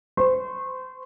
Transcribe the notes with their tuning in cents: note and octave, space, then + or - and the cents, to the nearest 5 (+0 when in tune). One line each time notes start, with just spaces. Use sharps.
C5 -30 C#6 -35